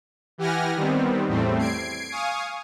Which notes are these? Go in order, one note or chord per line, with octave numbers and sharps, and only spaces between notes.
E3 G4 F#5 G#5 F6 A#6
D#3 G3 B3 C4
E2 A2 G3 A3 C4
G#6 C7 D7
F5 G#5 C#6 D#6